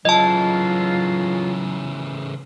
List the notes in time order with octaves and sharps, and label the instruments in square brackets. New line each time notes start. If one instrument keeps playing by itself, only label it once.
[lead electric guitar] C#3 E3 [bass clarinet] F#3 [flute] F4 [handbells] D#5 A5